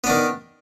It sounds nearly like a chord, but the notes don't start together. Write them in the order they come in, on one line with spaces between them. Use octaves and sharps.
B3 D4 D#3